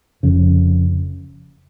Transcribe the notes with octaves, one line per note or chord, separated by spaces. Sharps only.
F1 F2 C#3